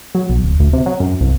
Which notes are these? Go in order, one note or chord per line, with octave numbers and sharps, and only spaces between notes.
F#3
B1
D1
D2
C3
F#3
F#2
C2